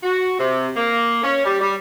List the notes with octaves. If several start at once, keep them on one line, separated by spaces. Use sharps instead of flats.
F#4
C3
A#3
C#4
G3
G3